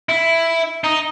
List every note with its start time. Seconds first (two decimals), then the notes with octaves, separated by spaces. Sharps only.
0.09 E4
0.84 D#4